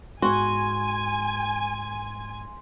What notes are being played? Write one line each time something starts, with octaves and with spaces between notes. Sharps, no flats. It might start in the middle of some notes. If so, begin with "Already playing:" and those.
G#2 F#4 G#5 C6